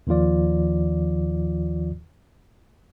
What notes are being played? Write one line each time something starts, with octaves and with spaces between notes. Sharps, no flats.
D#2 D#3 F3 F4 D5